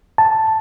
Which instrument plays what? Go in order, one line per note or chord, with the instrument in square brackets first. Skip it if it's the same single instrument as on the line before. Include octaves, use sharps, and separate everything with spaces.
[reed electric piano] A5